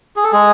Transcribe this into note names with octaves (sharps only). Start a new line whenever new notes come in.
G#4
A4
G#3 G#4